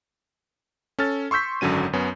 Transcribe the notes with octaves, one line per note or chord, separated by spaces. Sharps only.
C#4 A4 F6 A6
C6 C#6 E6 G6 B6
G#1 F#2 D3 F#3 C#4 D#7
F#2 B3 C#4